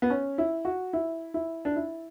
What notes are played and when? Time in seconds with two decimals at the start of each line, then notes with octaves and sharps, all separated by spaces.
0.02 B3
0.10 C#4
0.38 E4
0.65 F#4
0.93 E4
1.34 E4
1.65 D4
1.76 E4